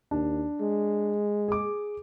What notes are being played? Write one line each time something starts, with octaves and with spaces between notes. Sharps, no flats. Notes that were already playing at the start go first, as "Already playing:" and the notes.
D#2 D4
G#3
G#4 D6